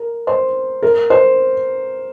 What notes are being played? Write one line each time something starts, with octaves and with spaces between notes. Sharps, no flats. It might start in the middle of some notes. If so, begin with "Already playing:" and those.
Already playing: A#4
C5
A#4
C5